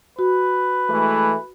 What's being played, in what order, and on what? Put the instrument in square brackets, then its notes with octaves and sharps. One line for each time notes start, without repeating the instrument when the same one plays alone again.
[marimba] F#4 [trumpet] B4
[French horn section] E3 G#3 A3